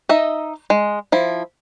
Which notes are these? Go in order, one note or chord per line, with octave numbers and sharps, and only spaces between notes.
D#4 D#5 E5
G#3
F3 E4